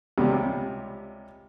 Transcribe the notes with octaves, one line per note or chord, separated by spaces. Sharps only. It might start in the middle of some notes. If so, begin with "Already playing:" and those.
C#2 C3 G3